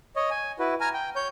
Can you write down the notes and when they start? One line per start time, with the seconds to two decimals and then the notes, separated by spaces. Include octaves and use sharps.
0.16 C#5 D#5
0.31 G#5
0.59 E4 F#4 B4
0.81 G#5 A#5 F6
0.93 G5
1.16 C#5 G6